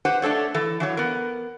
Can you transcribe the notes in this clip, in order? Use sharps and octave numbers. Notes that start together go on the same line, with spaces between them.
G4 B4 C5 F#5
A3 D4 A4 C#5
E3 A4
E3 F#3 C#5
B3 A#4